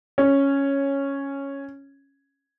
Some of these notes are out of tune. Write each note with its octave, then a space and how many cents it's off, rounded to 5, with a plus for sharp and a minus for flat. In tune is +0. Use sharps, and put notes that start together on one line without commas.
C#4 -5